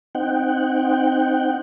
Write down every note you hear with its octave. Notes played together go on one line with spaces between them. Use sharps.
C4 D#4 F#5 G5